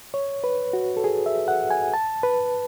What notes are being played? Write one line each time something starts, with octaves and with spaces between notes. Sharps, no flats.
C#5
B4
F#4
A4
G#4
E5
F#5
G#5
A5
B4